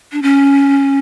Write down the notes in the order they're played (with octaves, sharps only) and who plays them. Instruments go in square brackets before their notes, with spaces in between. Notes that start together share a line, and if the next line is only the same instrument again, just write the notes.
[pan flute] D4
C#4